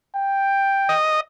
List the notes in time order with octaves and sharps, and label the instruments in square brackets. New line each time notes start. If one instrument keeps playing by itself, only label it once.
[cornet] G5
[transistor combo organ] D#5